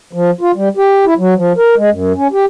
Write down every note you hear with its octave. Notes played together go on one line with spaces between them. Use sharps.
F3
F4
G3
G4
E4
F#3
F3
A#4
G#3
F#2
C#4
G4